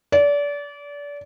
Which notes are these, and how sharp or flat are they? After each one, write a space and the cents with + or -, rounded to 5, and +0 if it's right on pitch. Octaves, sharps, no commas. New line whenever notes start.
D5 -30